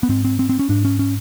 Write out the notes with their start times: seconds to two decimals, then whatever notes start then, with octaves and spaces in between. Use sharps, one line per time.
0.03 B3
0.09 G#2 C4
0.25 C4
0.39 C4
0.49 C4
0.59 C#4
0.69 G#2 D4
0.85 C#4
0.99 C#4